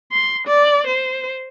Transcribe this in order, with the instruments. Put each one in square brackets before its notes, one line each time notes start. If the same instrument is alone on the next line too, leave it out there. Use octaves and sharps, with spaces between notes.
[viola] C6
D5
C5